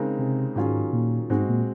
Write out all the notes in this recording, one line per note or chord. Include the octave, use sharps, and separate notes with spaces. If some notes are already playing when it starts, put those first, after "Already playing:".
Already playing: C#3 G#3 C4 D#4 A#4
C3
G#2 D#3 F#3 C#4 F4 G#4
A#2
G#2 G#3 C4 F#4
A#2